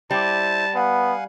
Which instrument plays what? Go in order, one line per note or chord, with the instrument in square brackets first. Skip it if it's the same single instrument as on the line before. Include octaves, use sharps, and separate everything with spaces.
[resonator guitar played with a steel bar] G3 [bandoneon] E4 C5 [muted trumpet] A5
[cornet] B3 [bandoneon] F5 F#5 G#5